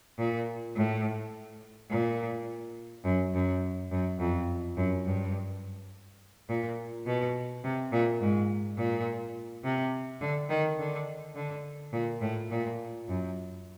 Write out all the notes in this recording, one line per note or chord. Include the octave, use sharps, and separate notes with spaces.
A#2
A2
A#2
F#2
F#2
F#2
F2
F#2
G2
A#2
B2
C3
A#2
G#2
A#2
C3
D3
D#3
D3
D3
A#2
A2
A#2
F#2